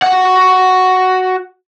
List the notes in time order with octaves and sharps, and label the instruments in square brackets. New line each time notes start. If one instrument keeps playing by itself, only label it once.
[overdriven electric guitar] F#4 F#5